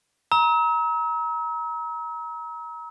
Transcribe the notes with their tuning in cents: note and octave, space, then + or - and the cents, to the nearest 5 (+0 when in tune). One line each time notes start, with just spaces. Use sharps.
A#5 +20 E6 -40